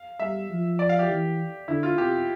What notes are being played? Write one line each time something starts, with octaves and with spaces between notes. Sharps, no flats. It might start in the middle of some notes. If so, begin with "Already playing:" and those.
Already playing: F5
G3 E5
F3
D5
F5
G4
E3
D3 E4
F4
C3 G4